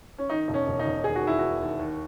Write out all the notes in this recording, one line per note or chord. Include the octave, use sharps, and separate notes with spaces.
C#4
D#3 D#4
E1
C#4
E1
D#4
E1
D#2 G#4
F#4
D#3 E4
D#2 F#4
D#2
D#2